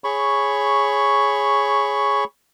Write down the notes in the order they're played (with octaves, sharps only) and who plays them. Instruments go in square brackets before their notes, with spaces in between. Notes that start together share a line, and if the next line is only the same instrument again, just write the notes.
[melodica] G#4 C#5 B5 C#6